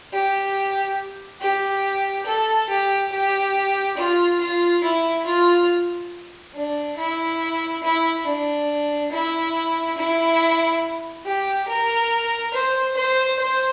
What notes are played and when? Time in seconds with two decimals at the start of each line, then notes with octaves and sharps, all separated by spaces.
0.13 G4
1.41 G4
2.26 A4
2.69 G4
3.12 G4
3.97 F4
4.41 F4
4.84 E4
5.26 F4
6.55 D4
6.98 E4
7.83 E4
8.26 D4
9.12 E4
9.98 E4
11.25 G4
11.68 A#4
12.54 C5
12.97 C5
13.39 C5